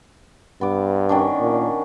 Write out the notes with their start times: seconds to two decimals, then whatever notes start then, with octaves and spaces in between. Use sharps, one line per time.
0.61 G2 B3 D6
1.09 D#3 C#4 D4
1.41 A#2